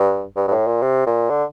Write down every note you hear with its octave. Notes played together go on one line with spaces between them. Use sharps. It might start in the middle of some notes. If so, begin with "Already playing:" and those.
Already playing: G2
G2
G2
A2
A#2
C3
A#2
D3